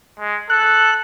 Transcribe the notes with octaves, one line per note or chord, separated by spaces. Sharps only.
G#3
A4 F#6